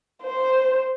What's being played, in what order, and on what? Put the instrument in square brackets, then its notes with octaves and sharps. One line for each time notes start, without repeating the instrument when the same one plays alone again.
[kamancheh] C5